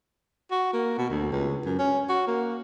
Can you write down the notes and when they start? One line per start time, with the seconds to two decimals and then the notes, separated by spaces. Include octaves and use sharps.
0.51 F#4
0.73 A#3
0.98 B2
1.10 D2
1.32 C#2
1.65 F#2
1.79 C#4
2.09 F#4
2.27 A#3